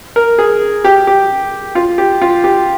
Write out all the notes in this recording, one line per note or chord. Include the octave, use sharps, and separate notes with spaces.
A#4
G#4
G4
G4
F4
G4
F4
G4